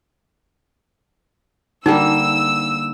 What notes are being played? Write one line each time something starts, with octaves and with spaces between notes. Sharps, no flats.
D3 G3 A#3 D#4 E6